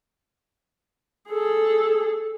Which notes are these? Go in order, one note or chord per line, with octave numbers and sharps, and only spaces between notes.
G#4 A4